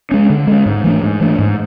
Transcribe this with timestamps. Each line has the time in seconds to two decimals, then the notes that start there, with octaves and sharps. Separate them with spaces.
0.11 G#3 C#4
0.30 D3
0.47 G#3 C#4
0.66 G#2
0.84 E3 A3 D4
1.03 G#2
1.20 E3 A3 D4
1.39 G#2